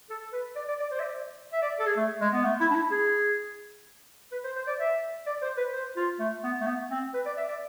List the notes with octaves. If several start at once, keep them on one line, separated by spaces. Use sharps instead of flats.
A4
B4
D5
D5
D5
C5
E5
D5
E5
D5
A4
G#4
A3
G#3
B3
A3
E4
D4
E4
G#4
B4
C5
C5
D5
E5
D5
C5
B4
C5
F4
A3
B3
A3
B3
C4
B4
D5
E5
D5